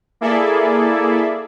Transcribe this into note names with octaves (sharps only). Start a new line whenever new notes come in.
A#3 E4 G#4 A4 D5 E5